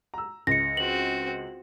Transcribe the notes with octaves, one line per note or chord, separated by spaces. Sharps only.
A#5 E6
C#2 A#6 C#7
C4 F#4 F#7